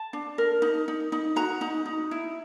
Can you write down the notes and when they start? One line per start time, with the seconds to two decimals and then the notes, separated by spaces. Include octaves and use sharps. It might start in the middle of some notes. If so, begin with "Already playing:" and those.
Already playing: A5
0.13 D4
0.38 A#4
0.62 D#4
0.88 D#4
1.12 D#4
1.36 F#4 A#5
1.61 D#4
1.86 D#4
2.11 E4